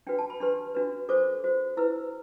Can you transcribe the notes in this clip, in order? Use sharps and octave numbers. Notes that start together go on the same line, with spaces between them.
D4 F#4 B4 G5
A5
B5
D4 G4 B4 C6
D4 F#4 B4
D4 F#4 A4 C5 D6
F#4 C5
E4 B4 E6